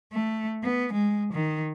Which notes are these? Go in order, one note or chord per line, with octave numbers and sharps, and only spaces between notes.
A3
B3
G#3
D#3